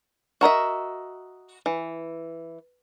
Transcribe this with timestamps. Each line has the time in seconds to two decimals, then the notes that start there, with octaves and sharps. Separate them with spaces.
0.41 F#4 A#4 D#5 E5
1.66 E3